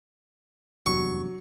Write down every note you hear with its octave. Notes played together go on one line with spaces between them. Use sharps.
F1 E2 G2 F#3 C#6